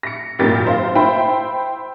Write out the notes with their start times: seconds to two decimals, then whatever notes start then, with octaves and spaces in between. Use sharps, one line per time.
0.03 A#6 C#7
0.39 G#1 F#2 A#2 G4 A#4 A6
0.66 C5 F5
0.95 E4 C5 G5 B5